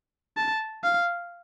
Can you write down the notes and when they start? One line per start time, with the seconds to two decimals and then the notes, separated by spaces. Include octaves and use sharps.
0.37 A5
0.84 F5